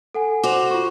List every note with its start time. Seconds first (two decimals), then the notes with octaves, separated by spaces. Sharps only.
0.14 A4 F#5 G#5
0.43 F#4 C5 D6 F7
0.71 F4 C#6